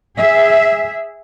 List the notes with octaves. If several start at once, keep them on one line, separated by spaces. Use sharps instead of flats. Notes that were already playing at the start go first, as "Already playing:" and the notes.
G#4 E5